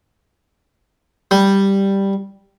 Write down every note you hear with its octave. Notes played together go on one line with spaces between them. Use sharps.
G3